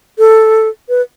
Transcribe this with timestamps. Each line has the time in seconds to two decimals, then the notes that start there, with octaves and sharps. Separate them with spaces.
0.19 A4
0.89 B4